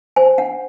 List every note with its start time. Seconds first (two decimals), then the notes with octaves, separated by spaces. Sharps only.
0.16 C5 G#5
0.38 D4 F#5